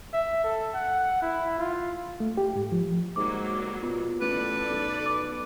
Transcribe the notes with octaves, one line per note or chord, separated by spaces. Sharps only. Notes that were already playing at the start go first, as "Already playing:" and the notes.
E5
A4
F#5
E4
F4
A3
G4
G#2
F3
G#2 F#3 G3 A#3 D6
B2 F4
A1 A4 B4 D5
B1
D6